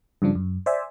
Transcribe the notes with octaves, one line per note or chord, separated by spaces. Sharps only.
G2 C#3 F3 D4
F#2
C5 D5 E5 G#5